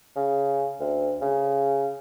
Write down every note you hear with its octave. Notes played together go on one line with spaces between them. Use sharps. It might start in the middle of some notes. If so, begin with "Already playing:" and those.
C#3
D2
C#3